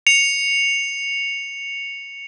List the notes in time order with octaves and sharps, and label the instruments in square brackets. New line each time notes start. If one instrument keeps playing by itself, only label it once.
[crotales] C#7 F7